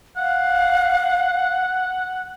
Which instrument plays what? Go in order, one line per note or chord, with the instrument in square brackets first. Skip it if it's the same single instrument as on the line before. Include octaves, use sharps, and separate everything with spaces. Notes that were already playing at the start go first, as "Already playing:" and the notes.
[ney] F5 [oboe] F#5